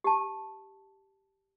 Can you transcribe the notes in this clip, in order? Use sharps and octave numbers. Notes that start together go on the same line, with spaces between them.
G4 A5